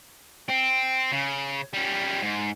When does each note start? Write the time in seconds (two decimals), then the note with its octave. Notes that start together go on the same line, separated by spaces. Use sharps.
0.49 C4
1.12 C#3
1.73 G3 C#4
2.22 G#2